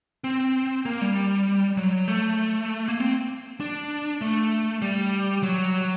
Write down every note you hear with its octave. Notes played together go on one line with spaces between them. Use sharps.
C4
A#3
G3
F#3
A3
A#3
C4
D4
A3
G3
F#3